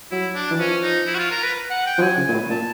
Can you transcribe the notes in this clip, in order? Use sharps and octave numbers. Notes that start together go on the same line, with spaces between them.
F#3 E4
D4
E3
F3 C#4
D#4
E4
F#4
F4
A#4
B4
F#5
G5
F3
F#3 G#5
C#3
A#2
A2
A#2 A5